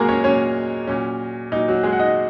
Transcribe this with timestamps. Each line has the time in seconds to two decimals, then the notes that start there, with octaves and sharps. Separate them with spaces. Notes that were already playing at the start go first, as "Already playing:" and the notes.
Already playing: A#2 F#3 G#3 A#3 F#4 G#4 A#4
0.09 C#4 C#5
0.24 A#2 F#3 C#4 C#5
0.87 A#2 F#3 C#4
1.52 A#2 F#3 D#4
1.68 F#3 F#4
1.83 G#3 G#4
1.93 F#5
1.99 D#4 D#5